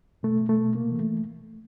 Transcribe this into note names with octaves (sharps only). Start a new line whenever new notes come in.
B2 A3
B2
A3
B2
C3 A#3
E3
A3